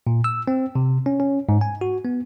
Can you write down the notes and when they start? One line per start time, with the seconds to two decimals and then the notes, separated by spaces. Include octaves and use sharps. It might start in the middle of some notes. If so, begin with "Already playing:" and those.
0.07 A#2
0.24 E6
0.48 C4
0.75 C3
1.06 C#4
1.20 C#4
1.49 G#2
1.61 G#5
1.81 F#4
2.05 B3